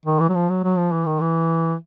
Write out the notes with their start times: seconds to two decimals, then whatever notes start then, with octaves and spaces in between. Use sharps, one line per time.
0.06 D#3
0.20 E3
0.29 F#3
0.35 F3
0.49 F#3
0.64 F#3
0.78 F3
0.92 E3
1.06 D#3
1.20 E3